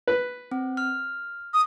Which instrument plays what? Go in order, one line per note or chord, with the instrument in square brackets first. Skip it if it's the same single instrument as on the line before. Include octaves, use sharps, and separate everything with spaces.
[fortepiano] B4
[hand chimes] C4
F6
[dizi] D#6